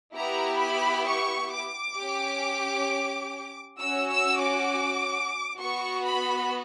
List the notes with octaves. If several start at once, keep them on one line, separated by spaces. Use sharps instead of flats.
B3 E4 G4 A#5
B5
C#6
D6
C#4 G4
C#4 F#4 E6
E6
D6
B3 F#4 C#6
B5